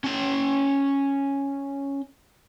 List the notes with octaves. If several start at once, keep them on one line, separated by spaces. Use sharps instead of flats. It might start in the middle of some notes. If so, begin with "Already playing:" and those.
C#4 G5